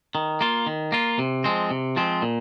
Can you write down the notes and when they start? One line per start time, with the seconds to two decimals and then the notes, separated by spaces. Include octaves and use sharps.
0.15 D#3
0.41 A#3 F4
0.67 D#3
0.92 A#3 F4
1.19 C3
1.44 F3 G#3 C4
1.71 C3
1.97 F3 G#3 C4
2.22 A#2